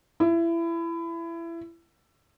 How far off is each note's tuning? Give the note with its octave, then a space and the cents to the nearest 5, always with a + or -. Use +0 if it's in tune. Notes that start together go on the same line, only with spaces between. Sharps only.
E4 +25